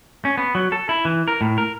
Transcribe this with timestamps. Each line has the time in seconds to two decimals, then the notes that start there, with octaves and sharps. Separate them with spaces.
0.25 C#4
0.38 B3
0.55 F#3
0.72 A4
0.89 E4
1.05 E3
1.28 A#4
1.41 A2
1.58 A#4